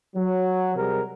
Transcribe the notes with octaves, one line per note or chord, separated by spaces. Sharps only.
F#3
C3 G3 G#4 A#4